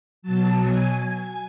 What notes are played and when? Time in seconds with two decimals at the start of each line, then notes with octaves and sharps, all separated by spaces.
0.22 B2 F#3 A5
0.62 G#5